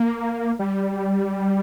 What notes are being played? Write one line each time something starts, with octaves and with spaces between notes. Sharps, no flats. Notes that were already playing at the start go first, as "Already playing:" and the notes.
Already playing: A#3
G3